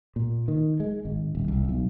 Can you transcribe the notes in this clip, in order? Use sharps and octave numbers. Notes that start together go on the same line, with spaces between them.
A#2
D#3
G#3
G#1
D#1
C2
B1